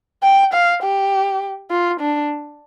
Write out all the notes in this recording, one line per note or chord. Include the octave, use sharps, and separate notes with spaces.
G5
F5
G4
F4
D4